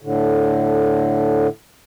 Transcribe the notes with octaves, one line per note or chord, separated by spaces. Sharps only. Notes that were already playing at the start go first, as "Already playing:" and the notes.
A2 D3